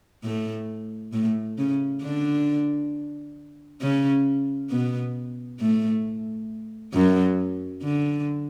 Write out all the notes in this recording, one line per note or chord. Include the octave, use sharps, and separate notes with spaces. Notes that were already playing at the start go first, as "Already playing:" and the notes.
A2 A3
A2 A3
C#3 C#4
D3 D4
C#3 C#4
B2 B3
A2 A3
F#2 F#3
D3